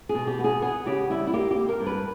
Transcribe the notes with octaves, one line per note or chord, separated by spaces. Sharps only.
G#4
B2
G4
B3
G#4
B3 G#4
C#3 G4
G3 E4
E4
A#3 G4
G4
A#3
A#4
G2
B4